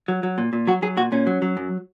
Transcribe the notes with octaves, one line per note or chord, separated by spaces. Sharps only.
F#3
F#3
A#2
A#2
F#3 F#4
F#3 G#4
A#2 F#4
A#2 C#4
F#3
F#3
F#2